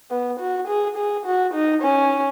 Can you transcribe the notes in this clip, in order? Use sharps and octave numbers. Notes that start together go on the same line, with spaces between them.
B3
F#4
G#4
G#4
F#4
D#4
C#4